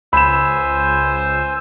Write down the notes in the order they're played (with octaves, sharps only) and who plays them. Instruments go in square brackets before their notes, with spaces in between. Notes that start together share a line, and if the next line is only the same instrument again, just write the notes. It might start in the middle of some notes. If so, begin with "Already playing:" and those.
[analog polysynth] C#2 [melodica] C5 G#5 [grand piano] B5 E7 [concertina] E6